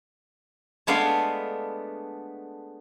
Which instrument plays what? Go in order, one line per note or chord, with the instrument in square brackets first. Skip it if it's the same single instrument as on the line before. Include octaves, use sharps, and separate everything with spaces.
[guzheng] G#3 A3 B3 D4 F5